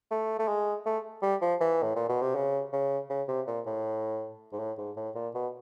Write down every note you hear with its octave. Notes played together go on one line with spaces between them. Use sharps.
A3
A3
G#3
A3
G3
F3
E3
A2
A#2
B2
C3
C#3
C#3
C#3
C3
A#2
A2
G#2
A2
G#2
A2
A#2
B2